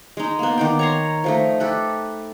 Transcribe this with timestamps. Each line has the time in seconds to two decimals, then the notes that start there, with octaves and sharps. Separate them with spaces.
0.17 G#3 D#4
0.39 A#3 B3
0.58 D#3 D5 G5
0.79 C#5 A#5 C6
1.24 F3 A3 D#4
1.60 G4 A4 B4